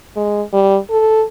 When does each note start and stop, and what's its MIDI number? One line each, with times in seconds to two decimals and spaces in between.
0.16 0.42 56
0.53 0.77 55
0.90 1.24 69